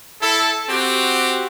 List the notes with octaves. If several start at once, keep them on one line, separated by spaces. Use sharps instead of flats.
E4 A4
C4 F#4 G4